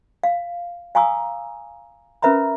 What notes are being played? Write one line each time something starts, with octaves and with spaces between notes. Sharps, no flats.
F5
F5 G#5 A#5 C#6 D#6 E6
C#4 A#4 B4 E5 A#5 B5